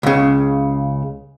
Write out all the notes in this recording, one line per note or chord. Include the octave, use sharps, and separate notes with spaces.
C#2 C#3